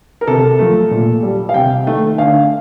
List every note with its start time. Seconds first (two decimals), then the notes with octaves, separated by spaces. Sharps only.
0.21 A#4
0.27 C3 A4
0.59 F3 A3
0.91 A#2
1.23 G3
1.49 F5
1.54 C3 G5
1.87 D#3 A3
2.18 D3 F5